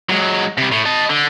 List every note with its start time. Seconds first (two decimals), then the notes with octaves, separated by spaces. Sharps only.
0.09 F#3 G#3
0.58 C3 G3
0.72 A2
0.86 D#5 A5
1.10 D3